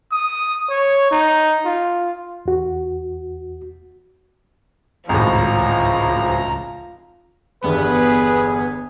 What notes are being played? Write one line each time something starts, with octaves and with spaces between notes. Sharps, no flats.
D#6
C#5
D#4
F4
E2 F#4
G#1 C#2 A2 F3 A#5
G1 E2 G2 B3 G#4 B4